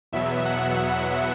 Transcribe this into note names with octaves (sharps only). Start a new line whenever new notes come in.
E2 B2 F#3 B3 E5
F#5